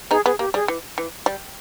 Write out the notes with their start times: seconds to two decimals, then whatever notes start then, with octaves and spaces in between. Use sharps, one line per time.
0.11 B3 D#4 G#4
0.25 B3 G#4
0.39 A#3 G4
0.54 G3 G#4
0.68 E3
0.98 E3
1.26 G3